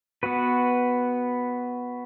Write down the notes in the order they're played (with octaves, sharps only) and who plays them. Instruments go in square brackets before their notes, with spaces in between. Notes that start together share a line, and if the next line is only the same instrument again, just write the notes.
[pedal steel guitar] B3 F#4 B4